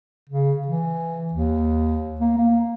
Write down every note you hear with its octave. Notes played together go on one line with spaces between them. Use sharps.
C#3
E3
D#2
A#3
A#3